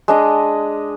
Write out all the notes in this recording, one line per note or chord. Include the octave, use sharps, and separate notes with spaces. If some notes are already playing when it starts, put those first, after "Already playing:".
G#3 D4 D#5